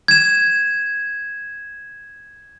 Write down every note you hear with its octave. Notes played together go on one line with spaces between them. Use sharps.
G#6 E7